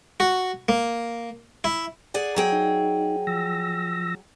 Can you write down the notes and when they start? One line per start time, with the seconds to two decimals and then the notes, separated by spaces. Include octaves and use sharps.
0.20 F#4
0.69 A#3
1.64 E4
2.14 G#4 D5 F#5
2.36 F#3 G#4 G5
2.53 D#4
3.27 F3 E6 A#6